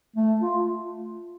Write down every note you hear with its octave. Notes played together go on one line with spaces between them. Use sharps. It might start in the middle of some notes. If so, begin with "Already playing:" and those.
A3
F4